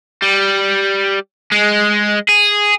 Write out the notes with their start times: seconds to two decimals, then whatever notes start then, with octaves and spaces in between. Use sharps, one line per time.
0.22 G3
1.52 G#3
2.29 G#4